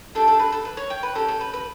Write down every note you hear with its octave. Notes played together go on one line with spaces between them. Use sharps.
A3 D4 G4 A4
A4
B4
A4
B4
C#5
G5
B4
C#4 G4 A4
A4
B4
B4